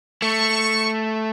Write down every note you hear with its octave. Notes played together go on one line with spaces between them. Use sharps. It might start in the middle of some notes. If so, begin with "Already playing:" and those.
A3 C#6